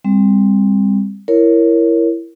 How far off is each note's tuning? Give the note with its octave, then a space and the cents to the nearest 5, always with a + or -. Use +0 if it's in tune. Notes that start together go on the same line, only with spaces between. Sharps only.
G3 +35 C4 +0
E4 +15 A#4 +0 C#5 +0